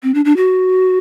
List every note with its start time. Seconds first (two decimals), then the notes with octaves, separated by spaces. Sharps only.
0.03 C4
0.14 D4
0.25 D4
0.37 F#4